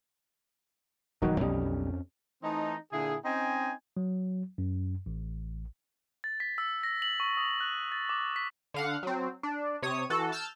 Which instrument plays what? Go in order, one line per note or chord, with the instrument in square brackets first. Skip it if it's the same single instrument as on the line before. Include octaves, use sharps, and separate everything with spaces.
[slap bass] E1 G2 F#3 [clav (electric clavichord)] D#3 D#4 F#4
[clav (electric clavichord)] B1 G3 D#5 [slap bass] F2 C#4
[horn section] E3 A3 C4 D#4
A#2 D3 E4 G#4
C4 C#4 D#4 D#5 G5 G#5
[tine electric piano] F#3
F#2
A1
[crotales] A6
B6
E6
A#6
F#7
C#6
D#6
F#6
A6
D6
B6
[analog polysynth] D3 F5 F#5
F#3 C4
D4
C3 C#5 D#6
E3 F#4 A4
A5 E6 F6 G6 A6